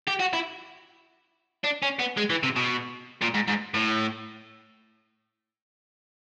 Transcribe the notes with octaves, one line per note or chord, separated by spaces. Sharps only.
G4
F#4
E4
D4
C#4
B3
G#3
E3
C3
B2
A#2
G#2
G#2
A2